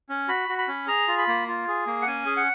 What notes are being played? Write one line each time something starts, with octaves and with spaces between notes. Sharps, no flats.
C#4
F#4 B5
F#4
B5
C#4
G#4 A#5
F4
B5
A#3
F4
G#4
A#3
F#5
C#4 G#5
G#4
F#5